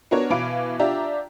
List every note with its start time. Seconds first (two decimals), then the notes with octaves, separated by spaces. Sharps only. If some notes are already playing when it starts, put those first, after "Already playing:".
0.11 B3 D4 F#4 A#4 C#5
0.30 B2 E3 B4 F5 D6 D7
0.79 D4 F4 G4 D5 E5 A#5